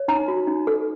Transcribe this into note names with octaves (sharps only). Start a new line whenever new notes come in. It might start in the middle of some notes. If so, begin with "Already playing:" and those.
Already playing: C#5
D#4 A#5
F#4
D#4
A4